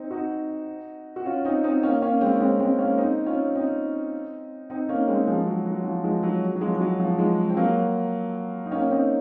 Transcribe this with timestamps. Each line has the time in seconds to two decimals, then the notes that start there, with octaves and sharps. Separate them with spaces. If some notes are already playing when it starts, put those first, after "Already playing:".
Already playing: C4 D#4
0.10 D#4 F#4
1.16 F#4
1.26 C#4 F4
1.45 C4 D#4
1.64 C4 D#4
1.83 A#3 C#4
2.02 A#3 C#4
2.21 G#3 C4
2.35 C#4
2.40 G#3 C4
2.60 G#3 C4
2.78 A#3 C#4
2.98 C4 D#4
3.26 C#4 F4
3.55 C4 D#4
4.70 C4 D#4
4.89 A#3 C#4
5.08 G#3 C4
5.27 F3 G#3
5.47 F#3
5.66 F#3
5.84 F3
6.04 F3 G#3
6.23 F#3
6.56 F#3
6.61 F3 G#3
6.75 G#3
6.81 F#3
7.00 F3
7.18 F3 G#3
7.50 C4
7.57 F#3 A#3
8.66 D#4
8.71 A#3 C#4
8.82 C#4
8.90 C4 D#4